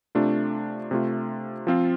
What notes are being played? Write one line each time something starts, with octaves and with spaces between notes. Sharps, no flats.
C3 A3 D4 F4
C3 A3 F4
F3 C4 F4